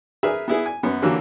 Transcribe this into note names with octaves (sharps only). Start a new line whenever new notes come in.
G#4 A#4 B4 E5 B5 E6
B3 E4 G#4
G#5
F#2 B3 C#4
D3 E3 F#3 G3 A#3